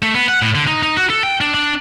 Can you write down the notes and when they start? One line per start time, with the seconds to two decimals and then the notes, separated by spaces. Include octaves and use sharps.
0.03 A3
0.15 B3
0.28 F#5
0.42 A2
0.55 D3
0.67 D#4
0.83 D#4
0.97 F#4
1.10 A4
1.23 G5
1.41 D4
1.54 D4